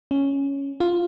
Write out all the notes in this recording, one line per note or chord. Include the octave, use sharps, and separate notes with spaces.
C#4
F4